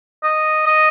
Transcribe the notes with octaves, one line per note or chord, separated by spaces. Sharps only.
D#5
D#5